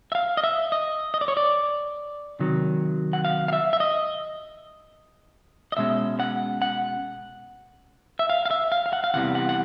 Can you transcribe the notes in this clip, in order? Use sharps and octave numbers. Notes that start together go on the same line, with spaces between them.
E5
F5
D#5
E5
D#5
D#5
D5
C#5
D5
C3 D#3 F#3
F#5
F5
F5
E5
E5
D#5
D#5
B2 G#3 C#4 E5
F#5
F#5
E5
F5
F5
E5
F5
F5
F#5
F5
E2 C3 E3 G3 F#5
F#5
F#5